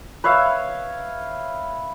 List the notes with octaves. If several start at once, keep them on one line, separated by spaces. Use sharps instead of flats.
B4 C#5 E5 F5